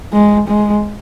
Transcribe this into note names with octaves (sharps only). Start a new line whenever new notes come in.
G#3
G#3